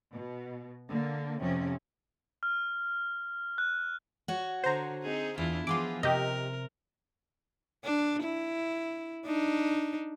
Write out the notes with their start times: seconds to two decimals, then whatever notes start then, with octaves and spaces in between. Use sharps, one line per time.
0.12 B2
0.89 D3 A#3
1.40 F2 C3 F3 C#4
2.43 F6
3.58 F#6
4.28 F#4 C#5
4.64 D3 C5 A#5
5.03 C4 D#4 G#4
5.38 E2 D4 E4 F4
5.67 E3 F3 B3 F4 G#4 C6 D6
6.03 C3 G4 A#4 D#5
7.84 D4
8.24 E4
9.26 D4 D#4